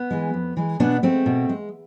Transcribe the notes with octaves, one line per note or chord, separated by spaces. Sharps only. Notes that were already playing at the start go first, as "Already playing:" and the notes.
Already playing: B3
E3 G#3
F2
E3 G#3
B2 B3 D4
G#3 A3 C4
B2
G#3